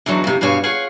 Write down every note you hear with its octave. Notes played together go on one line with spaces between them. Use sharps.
E2 D3 E3 F#3 D#4
F2 C3
G2 B2 C4 C#5 F5 G#5
F4 G#4 C#5 F#5